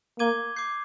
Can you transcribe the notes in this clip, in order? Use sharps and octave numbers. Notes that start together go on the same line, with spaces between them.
A#3 D6 G#6 D#7 G7
D6 G6 C7